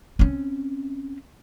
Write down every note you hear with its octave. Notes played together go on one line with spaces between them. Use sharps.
C4 C#4